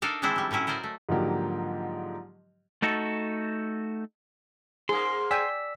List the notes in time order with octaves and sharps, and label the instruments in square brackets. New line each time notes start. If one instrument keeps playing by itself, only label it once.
[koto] D4 D#4 A4 A#4 F5
D#3 E3 G#3 C4 D4 E4
F#3 G3
A2 F#3 C#4 E4 A#5
A#4 C5 D5 D#5 G#5
A3
[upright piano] G#2 D3 F3 F#3 A#3 G4
[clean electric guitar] A3 D#4 F#4 A4
[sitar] G#2 A#3 [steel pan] G#4 [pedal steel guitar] C6
[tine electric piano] D5 E6 B6 [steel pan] G5 G#5